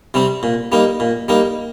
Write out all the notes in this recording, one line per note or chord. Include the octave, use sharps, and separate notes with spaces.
C3 G3 C4
A#2
G3 A#3 D#4
A#2
G3 A#3 D#4